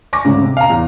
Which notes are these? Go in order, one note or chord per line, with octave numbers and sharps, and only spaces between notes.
G#5 C#6 D6 A#6
D2 G#2 C#3
C3
F5 A#5
E2